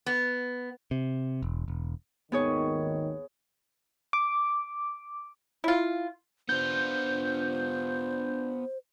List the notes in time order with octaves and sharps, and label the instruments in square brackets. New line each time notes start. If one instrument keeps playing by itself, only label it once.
[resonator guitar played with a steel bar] B3
[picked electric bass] C3
E1
E1
[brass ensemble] G#1 D#2 D#3 [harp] B3 G#4 C#5
[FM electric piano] D6
[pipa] E4 F4
[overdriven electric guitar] B3 F4 [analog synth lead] D4 [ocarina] C5 [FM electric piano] G6